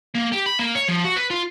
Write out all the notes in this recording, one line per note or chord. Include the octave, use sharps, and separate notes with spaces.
A#3
G4
B5
A#3
C#5
F3
F#4
B4
F4